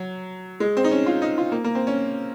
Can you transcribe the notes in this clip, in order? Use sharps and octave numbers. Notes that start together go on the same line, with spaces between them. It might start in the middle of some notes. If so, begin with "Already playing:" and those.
Already playing: F#3
G#3
C4
D#4
C#4
F4
D#4
F4
A#3
A#3
C4
C#4